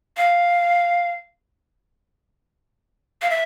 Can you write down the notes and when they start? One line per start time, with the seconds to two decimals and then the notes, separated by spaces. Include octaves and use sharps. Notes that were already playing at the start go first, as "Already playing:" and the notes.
0.17 F5
3.22 F5
3.30 E5